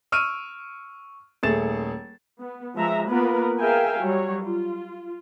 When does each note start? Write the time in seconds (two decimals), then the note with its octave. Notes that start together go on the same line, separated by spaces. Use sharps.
0.12 C#6 E6 F6 D7 D#7
1.43 D#1 A3 G#4 A6 E7
2.39 B3
2.75 F3 G#3 E5 A#5
3.09 A#3 B3 F4 A#4 B4
3.59 G#4 A#4 E5 F5 G5 G#5
3.99 F#3 G3 C#5
4.44 F4